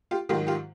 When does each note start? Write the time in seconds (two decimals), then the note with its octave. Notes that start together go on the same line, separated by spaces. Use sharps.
0.11 F4 G4
0.29 G#2 D#3 F#3 F4 G4
0.47 F4 G4